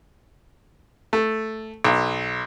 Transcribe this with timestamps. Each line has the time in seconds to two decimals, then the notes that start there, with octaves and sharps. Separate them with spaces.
1.13 A3
1.84 B1